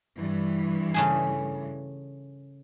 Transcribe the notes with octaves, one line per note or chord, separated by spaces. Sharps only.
G2 E3
C#3 A3 G#4